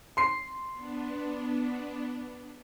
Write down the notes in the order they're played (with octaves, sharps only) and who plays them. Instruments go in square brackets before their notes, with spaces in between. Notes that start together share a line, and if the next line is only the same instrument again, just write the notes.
[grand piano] C6 C7
[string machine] B3 D4